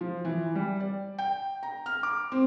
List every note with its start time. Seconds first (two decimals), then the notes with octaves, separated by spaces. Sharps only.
0.01 F3
0.25 E3
0.55 G3
0.80 D5
1.18 G5
1.63 A#5
1.86 F6
2.03 D6
2.32 C4